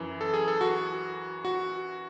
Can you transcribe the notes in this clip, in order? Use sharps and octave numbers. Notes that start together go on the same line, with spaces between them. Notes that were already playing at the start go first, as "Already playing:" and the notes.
Already playing: F#2 E3
A4
G#4
A4
F#4
F#4